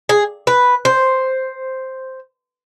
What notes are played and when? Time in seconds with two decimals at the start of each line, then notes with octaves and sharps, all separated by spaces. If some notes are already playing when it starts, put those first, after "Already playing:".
0.09 G#4
0.47 B4
0.85 C5